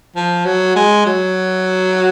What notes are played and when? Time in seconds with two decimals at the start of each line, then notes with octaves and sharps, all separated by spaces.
0.16 F3
0.45 F#3
0.76 G#3
1.06 F#3